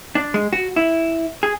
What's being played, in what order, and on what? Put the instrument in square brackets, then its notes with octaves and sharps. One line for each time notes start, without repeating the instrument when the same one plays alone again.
[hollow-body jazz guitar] D4
G#3
F#4
E4
G#4